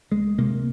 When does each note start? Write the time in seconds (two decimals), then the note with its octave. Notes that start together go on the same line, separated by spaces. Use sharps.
0.11 C#2 G#3
0.38 C3 A#3